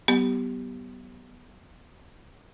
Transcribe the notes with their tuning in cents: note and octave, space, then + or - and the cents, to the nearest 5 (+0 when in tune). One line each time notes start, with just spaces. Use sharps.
F#3 +40 B3 +0 G4 -5